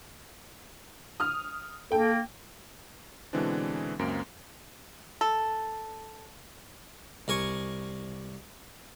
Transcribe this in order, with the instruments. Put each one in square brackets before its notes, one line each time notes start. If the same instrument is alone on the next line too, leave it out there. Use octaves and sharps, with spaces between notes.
[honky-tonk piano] D#6 F6
[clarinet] A#3 [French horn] A4 [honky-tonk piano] G5
[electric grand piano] B2 D3 E3 G#3 C4 D4
C#2 F#2 A#3 C4 D7
[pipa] A4
[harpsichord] C2 A#4 G#5 C#6